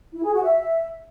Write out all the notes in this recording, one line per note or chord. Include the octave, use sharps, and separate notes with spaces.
E4
G#4
F#4
E5